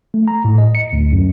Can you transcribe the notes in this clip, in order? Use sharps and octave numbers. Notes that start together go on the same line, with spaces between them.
A3
A#5
A2
D#5
C#7
D2
F#2